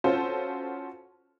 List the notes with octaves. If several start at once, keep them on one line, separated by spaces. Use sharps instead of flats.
C#4 F4 F#4 A4 C5